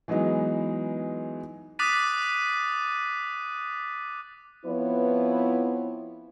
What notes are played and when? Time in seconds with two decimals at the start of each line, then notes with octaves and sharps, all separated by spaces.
0.08 E3 F#3 G#3 B3 D#4
1.79 D6 D#6 F#6 A6 B6 D#7
4.65 F3 B3 C4 E4 B4 C#5